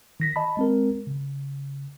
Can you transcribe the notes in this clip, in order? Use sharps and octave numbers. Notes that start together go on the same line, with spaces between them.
D#3 A#6 B6
D#5 A5 B5
G#3 C4 A#4
C#3